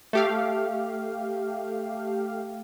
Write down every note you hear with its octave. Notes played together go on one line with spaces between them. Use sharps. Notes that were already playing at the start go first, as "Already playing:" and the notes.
A3 G4 F5